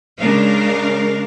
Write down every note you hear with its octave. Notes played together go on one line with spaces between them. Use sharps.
C#3 G#3 D4 A#4 F5